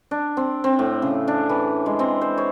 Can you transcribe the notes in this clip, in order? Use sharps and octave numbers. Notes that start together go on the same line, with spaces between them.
D4
C4
C4
A2
C#3
D4
E3
G#3
C4
C5
C#5